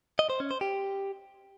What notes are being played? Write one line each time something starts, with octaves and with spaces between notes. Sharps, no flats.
D#5
C5
C#4
C5
G4